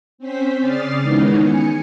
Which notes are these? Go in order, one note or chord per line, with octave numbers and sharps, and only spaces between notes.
C4 C#4 C5 B6
C#3 D5 D#6 F6 A6 C7
D#3 E3 G#3 B3 C#4 D#4
G#5 C#7